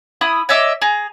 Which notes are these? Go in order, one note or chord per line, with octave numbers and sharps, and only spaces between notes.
E4 B5 D#6
C#5 D#5 E5 D6
G#4 A#5